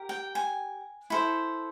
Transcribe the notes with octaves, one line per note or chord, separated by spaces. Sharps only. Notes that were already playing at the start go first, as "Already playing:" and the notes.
Already playing: G4 A#4
G5
G#5
E4 A4 C5